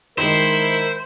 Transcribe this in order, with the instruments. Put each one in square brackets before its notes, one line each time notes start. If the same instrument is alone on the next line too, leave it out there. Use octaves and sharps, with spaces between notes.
[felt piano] D#3 G#3 [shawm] E4 [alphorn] A#4 [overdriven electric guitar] C5